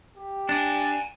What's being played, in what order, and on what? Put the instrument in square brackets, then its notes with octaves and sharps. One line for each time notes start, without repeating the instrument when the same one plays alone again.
[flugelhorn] G4
[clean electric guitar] D4 [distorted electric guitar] F#5 G#5